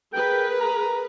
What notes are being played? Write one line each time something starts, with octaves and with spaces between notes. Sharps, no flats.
G#4 A#4 B4 G5
A#5